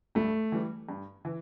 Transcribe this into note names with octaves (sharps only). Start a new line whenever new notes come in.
G2 A3
E3 G3
G2
E3